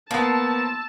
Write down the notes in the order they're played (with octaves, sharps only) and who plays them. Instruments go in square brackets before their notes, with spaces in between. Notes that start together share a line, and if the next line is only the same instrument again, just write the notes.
[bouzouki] F3 [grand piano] A#3 B3 [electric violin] A5 E6